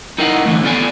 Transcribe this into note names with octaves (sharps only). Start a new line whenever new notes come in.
D#4 E4 A#4 D#5 F5 F#5
D3 E3 A3
B3 F4 A4 D5 G#5